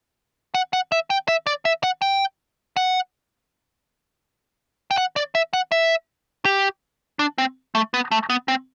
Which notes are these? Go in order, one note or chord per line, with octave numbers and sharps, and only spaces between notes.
F#5
F#5
E5
G5
E5
D5
E5
F#5
G5
F#5
G5
F#5
D5
E5
F#5
E5
G4
D4
C4
A3
B3
A3
B3
C4